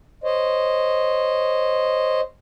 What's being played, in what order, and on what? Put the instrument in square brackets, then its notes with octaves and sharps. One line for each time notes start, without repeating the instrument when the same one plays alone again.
[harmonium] C5 C#5 D#5